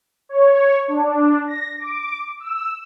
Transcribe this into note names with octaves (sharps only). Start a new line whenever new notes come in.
C#5
D4
A#6
D6
E6